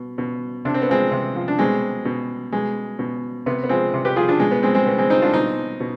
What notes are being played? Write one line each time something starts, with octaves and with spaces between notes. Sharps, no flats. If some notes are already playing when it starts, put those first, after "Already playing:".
Already playing: B2
B2
C3 D4
C4
B3
F3 G#3 C4
C3
F3
D4
B2 G#3 C4
B2
B2 G#3
B2
C3 B3
B3
F3 G#3 C4
C3
G4 B4
F3 F4 G#4
D4 F4
B2 G#3
B3
G#3 C4
G#3 C4
B2 B3
G#3 C4
C4 D#4
D4 F4
B2 C4 D#4
B2